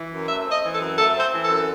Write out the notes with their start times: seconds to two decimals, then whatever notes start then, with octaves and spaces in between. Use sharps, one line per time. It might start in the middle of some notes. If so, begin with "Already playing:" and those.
Already playing: E3
0.11 F#2
0.28 A3 E5
0.45 C4
0.51 D#5
0.63 E3
0.74 A4
0.80 F#2
0.97 A3 A4
1.14 C4
1.20 C5
1.32 E3
1.43 A4
1.49 F#2